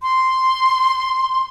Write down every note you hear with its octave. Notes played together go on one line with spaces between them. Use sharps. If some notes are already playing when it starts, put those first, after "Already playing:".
C6